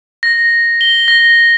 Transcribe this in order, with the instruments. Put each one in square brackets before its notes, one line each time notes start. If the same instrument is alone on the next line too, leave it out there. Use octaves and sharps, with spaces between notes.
[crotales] A#6
G7
A#6